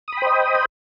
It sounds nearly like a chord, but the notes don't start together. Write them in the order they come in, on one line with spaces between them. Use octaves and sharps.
D#6 B5 G5 C5 D#5